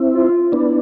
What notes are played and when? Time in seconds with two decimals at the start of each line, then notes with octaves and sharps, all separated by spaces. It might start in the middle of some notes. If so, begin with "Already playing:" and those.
Already playing: C4 E4
0.14 F4
0.52 B3 D4 E4